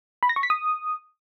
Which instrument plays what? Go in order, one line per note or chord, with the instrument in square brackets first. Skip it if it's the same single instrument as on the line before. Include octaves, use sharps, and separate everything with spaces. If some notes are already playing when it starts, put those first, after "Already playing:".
[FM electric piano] B5
A#6
C#6
B6
D#6